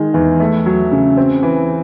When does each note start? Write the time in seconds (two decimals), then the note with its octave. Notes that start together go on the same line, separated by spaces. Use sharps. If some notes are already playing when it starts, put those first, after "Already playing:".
Already playing: D#3 G#3
0.14 E2
0.40 A3
0.66 F#3
0.92 C#3
1.17 C4
1.43 E3